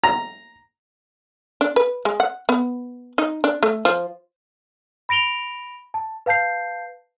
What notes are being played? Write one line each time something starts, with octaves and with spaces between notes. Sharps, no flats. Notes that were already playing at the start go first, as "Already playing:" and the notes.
A#5
D4
B4
G#3
F#5
B3
D#4
D4
A3
F3
B5 A#6 D7 F7 G7
A5
B4 F5 A5 G6 C7